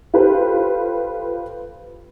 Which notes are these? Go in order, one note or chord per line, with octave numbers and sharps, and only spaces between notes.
F4 G4 A4 B4 C5